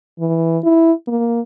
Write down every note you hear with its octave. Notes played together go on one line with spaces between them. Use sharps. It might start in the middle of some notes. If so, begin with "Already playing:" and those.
E3
E4
A#3